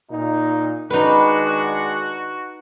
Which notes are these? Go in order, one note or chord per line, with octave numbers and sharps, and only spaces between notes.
A#2 D#4
D#3 G#3 D4 D#4 F#4 B4